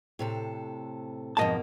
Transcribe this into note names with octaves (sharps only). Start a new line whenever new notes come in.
A2 C3 A4
F2 G#2 B2 A#3 D#5 A5